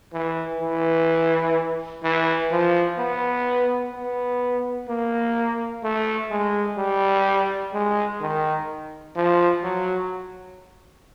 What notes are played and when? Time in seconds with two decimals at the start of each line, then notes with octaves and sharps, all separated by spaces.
0.13 E3
0.61 E3
2.03 E3
2.51 F3
2.98 B3
3.93 B3
4.88 A#3
5.84 A3
6.31 G#3
6.78 G3
7.73 G#3
8.21 D#3
9.16 F3
9.63 F#3